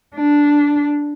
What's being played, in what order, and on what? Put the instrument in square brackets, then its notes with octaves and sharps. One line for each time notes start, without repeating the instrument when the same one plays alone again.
[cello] D4